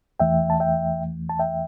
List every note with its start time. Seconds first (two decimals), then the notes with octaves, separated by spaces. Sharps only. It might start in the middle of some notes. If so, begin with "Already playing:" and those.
0.20 E2 E3 A3 E5 G5
0.50 A5
0.60 E5 G5
1.29 A5
1.39 E5 G5